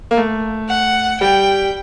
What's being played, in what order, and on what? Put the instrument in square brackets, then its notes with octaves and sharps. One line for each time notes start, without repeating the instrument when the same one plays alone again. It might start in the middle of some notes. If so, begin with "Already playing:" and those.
[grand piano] A#3
A3
[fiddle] F#5
[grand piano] G3 [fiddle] G5